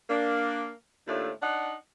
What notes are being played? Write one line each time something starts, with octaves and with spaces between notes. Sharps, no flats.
A#3 D4
D#2 A2 A3 D4 F4
D4 D#4 F#5